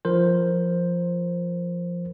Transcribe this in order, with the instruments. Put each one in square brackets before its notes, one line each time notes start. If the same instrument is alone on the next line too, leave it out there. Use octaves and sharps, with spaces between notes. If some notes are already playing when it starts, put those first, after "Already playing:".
[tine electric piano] F3 A#4 C5